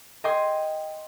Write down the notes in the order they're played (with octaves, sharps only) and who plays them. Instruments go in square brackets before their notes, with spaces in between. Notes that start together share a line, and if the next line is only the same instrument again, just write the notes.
[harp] D#5 G5 G#5 C6 D#6